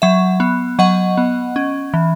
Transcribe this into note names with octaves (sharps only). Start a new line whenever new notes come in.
F#3 E5
B3
F#3 D#5 F#5
B3
C#4
E3